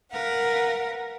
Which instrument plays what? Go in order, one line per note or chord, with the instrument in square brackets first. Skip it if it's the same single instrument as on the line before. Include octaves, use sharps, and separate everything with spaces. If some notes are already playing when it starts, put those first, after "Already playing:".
[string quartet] A#4 B4 F5 F#5